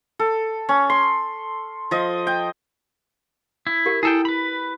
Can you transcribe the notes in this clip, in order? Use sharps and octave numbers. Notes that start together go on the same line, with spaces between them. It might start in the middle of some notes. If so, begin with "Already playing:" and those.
A4
C#4
C6
F3 D#5
G5
E4
G4 A#4
E4 G#4 A4 G5
B4 B5